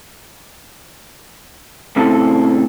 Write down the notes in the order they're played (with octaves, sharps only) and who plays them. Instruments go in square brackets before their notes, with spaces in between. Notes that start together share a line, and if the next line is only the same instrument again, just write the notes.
[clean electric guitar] A#2 C#3 A3 C4 E4 A4